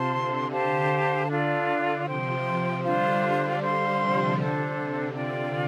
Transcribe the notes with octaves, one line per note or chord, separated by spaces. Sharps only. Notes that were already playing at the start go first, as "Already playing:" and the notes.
Already playing: C3 F4 C5 A5 C6
D3
G4 C5 F5 A5
D3 D4 F4 A4 D5
C3 F3 C5 G5 C6
D3 G3 D4 F4 C5
D3 G3
C5 F5 C6
C3 F3
D3 D4 A4 C5
C3
F4 D5 G5